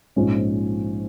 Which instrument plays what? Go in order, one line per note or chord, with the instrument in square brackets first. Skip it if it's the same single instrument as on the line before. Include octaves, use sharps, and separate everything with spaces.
[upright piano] A#1 G#2 F3 G#3 C#4